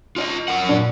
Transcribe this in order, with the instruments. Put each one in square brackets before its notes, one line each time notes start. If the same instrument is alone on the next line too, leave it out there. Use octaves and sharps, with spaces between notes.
[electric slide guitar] F4 D5 D#5
F#2 A#4 F#5
[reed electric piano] A#2 D4